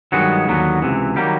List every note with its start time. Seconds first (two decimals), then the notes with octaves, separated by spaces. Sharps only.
0.12 G2 D#3 F#3 G#3 B3 F#4
0.48 D#2 D3 F#3 B3
0.82 C#2 C3 E3
1.16 D#3 F#3 G3 A#3 G4